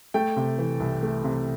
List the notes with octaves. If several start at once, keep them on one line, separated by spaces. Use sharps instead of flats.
A3 G5
C3
E3
C2
A3
C3